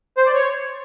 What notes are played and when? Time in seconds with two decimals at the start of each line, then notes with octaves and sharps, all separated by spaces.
0.18 C5
0.26 D5
0.34 C#5